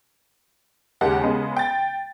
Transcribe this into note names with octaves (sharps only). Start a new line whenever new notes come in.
D#2 C#3 G#3 A#3 G4 F#5
C#3 G#3 B3
G5 A6